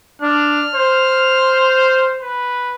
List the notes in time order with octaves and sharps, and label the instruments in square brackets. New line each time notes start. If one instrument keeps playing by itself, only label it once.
[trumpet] D4 [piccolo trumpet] F6
[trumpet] C5
[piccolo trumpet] B4